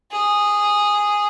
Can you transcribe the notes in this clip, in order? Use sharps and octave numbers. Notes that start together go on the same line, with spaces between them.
G#4